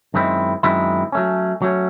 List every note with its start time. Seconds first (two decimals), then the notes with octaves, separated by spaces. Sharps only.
0.14 F#2 D#3 G#3 C4 E4
0.63 F#2 D#3 G#3 C4 E4
1.12 F#3 A3 C#4
1.62 F#3 A3 C#4